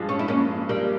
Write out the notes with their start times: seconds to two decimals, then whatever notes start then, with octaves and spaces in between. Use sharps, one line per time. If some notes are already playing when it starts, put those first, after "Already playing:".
Already playing: G2 F3 G#3
0.09 C#4
0.19 E4
0.28 A#3 C#4
0.69 G3 A#3